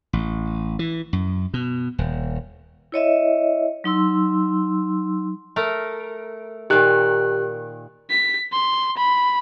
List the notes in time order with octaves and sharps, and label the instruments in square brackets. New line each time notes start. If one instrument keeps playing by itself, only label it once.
[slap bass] A1
E3
F#2
B2
D#1
[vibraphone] E4 C#5 D#5 E5
F#3 D#4 C6 E6
[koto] A3 A#4
[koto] A#2 D#3 [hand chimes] G4 F#6
[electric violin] B6
C6
B5